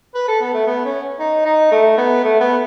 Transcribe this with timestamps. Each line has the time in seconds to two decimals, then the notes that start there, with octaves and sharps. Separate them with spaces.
0.15 B4
0.28 A4
0.41 B3
0.54 A3
0.67 B3
0.85 C#4
1.20 D#4
1.45 D#4
1.72 A3
1.98 B3
2.24 A3
2.41 B3